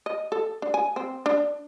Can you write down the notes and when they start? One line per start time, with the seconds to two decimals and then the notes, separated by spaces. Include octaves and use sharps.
0.06 D#5
0.32 A4
0.62 D4
0.74 G#5
0.96 C4
1.26 D4